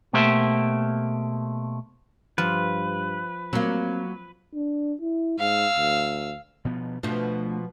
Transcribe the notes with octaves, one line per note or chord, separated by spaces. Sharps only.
B2 A3 A#3 G4 C5 E5
G2 F3 B4
F#3 A#3 C4
D4
E4
G#2 F5 E6
D2
B2 F3 B3
B2 F3 A3 D4